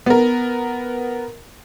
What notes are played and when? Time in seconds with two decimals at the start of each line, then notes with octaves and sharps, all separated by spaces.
0.06 B3 A#4